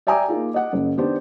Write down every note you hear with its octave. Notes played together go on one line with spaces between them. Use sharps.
D5 E5 G5 G#5 A#5 D6
A#3 D#4 F4 G#4
D#5 F#5
F#1 C#3
D#3 B3 D4 G4 C5